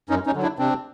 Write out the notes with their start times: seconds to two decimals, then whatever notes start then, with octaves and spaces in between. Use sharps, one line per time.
0.09 F#2 C#4 D#4
0.26 C#4 D#4
0.34 D3 F#3
0.42 D4 E4
0.59 C3 C4 D4